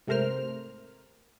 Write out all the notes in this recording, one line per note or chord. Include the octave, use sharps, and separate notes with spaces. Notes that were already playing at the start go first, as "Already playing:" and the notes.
G#2 C3 A3 A#4 C5 F6